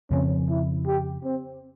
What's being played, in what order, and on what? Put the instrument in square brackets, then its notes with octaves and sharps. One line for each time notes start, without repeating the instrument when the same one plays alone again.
[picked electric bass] F2 C#3 F3 C4 [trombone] C#4
[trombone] E4
G4
C4